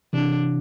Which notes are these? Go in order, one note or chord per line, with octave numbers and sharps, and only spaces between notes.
C3 E3 D4